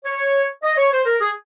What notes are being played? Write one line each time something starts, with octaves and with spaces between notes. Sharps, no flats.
C#5
D#5
C#5
C5
A#4
G#4